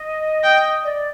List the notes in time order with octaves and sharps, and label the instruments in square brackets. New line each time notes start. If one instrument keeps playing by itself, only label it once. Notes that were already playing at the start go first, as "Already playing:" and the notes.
Already playing: [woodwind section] D#5
[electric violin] G5
[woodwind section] D5